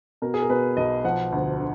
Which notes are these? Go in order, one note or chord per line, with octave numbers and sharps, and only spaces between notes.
B2 A#4
G#4
A#4
B2 B4
B1 D#5
F3 F#5
D2
D3